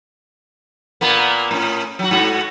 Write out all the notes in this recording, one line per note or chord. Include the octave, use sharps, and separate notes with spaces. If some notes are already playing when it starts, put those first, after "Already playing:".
A#2 A#3 B3
A2 C#4
F#3 F#4
G#2 F#4